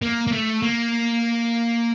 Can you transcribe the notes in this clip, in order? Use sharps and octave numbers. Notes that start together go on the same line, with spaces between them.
A#3
A#3
A3
A#3